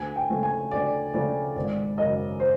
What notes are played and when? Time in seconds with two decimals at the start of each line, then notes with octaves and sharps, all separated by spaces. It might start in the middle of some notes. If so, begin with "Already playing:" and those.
Already playing: D2 G#5
0.16 G5
0.30 C#3 F3 A3
0.43 G#5
0.71 D2 D5
1.14 C#3 F3 A3 D5
1.56 G#1 D5
1.98 F#2 C#3 D#5
2.40 C5